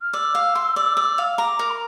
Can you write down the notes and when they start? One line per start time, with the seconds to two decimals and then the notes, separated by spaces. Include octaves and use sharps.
0.01 F6
0.13 D5 E6
0.35 F5
0.55 C6
0.76 D5
0.97 D5
1.18 F5
1.38 A#5 D6
1.59 A#4
1.70 A#5